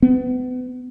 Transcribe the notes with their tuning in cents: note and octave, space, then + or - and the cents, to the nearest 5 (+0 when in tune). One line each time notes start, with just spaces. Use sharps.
B3 +30